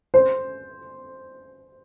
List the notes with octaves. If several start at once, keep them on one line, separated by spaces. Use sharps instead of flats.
C5